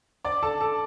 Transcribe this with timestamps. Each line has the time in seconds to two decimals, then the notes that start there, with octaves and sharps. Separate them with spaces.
0.25 D5 D6
0.43 A4 A5
0.60 A4 A5